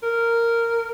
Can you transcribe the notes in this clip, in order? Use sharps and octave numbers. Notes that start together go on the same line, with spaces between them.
A#4